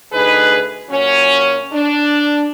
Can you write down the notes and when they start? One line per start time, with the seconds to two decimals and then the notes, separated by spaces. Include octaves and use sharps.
0.12 D2 D#4 G#4 B4
0.90 A#2 F#3 C#4
1.72 D4